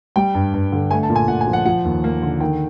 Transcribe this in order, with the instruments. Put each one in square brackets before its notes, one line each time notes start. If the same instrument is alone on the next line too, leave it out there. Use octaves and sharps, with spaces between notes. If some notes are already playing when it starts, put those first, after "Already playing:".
[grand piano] G3 G5
G2
G2
D3
A3 G#5
A5
A#2
G#5
A#2 F#5
G#5
F3
F#5
F3 F#5
D#2
A#3
D3
D#3 G5